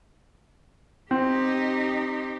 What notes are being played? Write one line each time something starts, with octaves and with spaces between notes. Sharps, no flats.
C4 D#4 G4